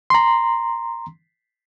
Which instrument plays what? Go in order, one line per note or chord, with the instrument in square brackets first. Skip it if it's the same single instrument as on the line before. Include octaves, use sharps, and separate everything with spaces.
[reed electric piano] A#5 C6